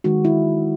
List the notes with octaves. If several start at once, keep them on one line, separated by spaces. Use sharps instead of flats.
D#3 G#3 F#4
E4